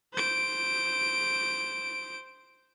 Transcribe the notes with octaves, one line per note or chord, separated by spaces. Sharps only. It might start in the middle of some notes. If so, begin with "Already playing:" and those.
C5 D7